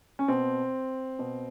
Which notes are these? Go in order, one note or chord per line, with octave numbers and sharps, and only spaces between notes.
C#4
B2 C4
B2